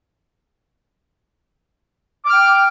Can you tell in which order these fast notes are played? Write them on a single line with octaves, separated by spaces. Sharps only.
D6 F6 G5